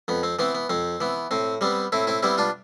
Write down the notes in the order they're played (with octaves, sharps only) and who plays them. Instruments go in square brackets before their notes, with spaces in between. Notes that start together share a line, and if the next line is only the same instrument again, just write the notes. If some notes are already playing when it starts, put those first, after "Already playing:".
[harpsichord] F2 B3
C4
E3 B3 C4
B3
F2 C4
E3 B3
A2 C4
G3 B3 C4
A2 C4 E4
C4 E4
G3 B3 C4 E4
D4 F4